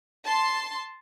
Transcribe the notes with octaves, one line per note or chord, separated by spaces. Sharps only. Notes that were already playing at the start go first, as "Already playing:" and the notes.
A5 C6